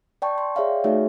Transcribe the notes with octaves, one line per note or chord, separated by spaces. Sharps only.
D5 G5 A5 C#6
C6
G#4 C#5 D5 E5 F5 G5
A3 D#4 F#4 G#4 C#5 E5